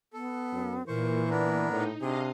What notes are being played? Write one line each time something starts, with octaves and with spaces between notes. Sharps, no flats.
B3 A4
F#2
A#2 E3 A#4 C5 C#6
B3 D4 A#4 D5
A2 D#4
C3 D4 G#4 D#5 F5